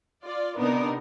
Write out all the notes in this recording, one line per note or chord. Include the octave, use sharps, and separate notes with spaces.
F4 D5
C3 B3 D4 D#4 A#4